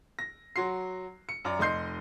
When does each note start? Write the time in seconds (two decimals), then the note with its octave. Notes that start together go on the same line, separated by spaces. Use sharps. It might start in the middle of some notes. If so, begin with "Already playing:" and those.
0.19 A#6
0.56 F#3 F#4 C6 C7
1.29 C#7
1.45 F#2 D5 A#5
1.59 F1 D#5 C6 G6 C7